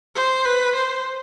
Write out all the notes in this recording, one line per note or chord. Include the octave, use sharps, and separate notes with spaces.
C5
B4
C5